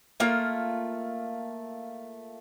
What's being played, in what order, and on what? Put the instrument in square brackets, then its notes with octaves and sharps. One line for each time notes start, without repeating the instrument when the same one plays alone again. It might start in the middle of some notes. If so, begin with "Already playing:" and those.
[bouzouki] A3 A#3 F4